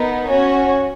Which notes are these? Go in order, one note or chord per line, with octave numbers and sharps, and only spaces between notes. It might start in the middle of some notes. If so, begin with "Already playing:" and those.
Already playing: B3 D#4 A#4
C#4 F#4 C#5